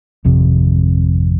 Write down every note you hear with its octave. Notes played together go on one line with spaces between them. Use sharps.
G#1 F2 C3